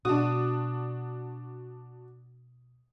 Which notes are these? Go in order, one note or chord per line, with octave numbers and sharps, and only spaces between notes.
B2 D4 F#4 D#6